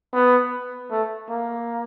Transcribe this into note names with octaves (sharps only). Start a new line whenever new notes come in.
B3
A3
A#3